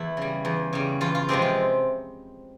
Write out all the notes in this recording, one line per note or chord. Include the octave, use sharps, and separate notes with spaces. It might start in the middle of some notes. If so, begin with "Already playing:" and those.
Already playing: E2 E4
C#3 G3
E2
C#3 G3
E2 F4
F4
C3 F3 G#3 C4 G4
F4